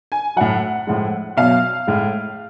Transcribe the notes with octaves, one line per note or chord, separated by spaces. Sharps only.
G#5
A2 F#3 F#5
A2 F3 G#3
B2 F#3 F5
A2 G#3